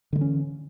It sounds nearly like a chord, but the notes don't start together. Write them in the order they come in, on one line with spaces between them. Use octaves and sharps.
D3 G#3 E3 C#4